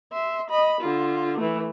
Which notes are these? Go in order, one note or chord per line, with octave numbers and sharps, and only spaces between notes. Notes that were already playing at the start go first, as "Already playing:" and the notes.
E5 C6
D#5 B5
D3 F4
E3 A3